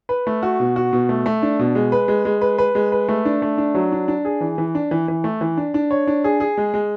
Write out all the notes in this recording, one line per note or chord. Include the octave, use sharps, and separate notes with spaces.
B4
A3
F#4
B2
F#4
B2
A3
A3
D4
B2
G#3
B4
G#3
G#3
B4
B4
G#3
B4
A3
D4
A3
D4
F#3
D4
D4
G#4
E3
E3
D4
E3
E3
A3
E3
D4
D4
C#5
D4
G#4
G#4
G#3
G#3